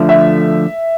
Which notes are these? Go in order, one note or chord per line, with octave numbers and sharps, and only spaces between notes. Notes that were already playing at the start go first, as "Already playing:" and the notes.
Already playing: D3 F3 A3
E5